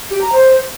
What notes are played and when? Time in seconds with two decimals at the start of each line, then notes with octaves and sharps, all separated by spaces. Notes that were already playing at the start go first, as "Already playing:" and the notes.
0.10 G4
0.21 A#5
0.32 C5